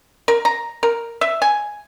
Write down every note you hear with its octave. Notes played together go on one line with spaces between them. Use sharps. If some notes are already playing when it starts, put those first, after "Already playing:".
A#4
A#5
A#4
E5
G#5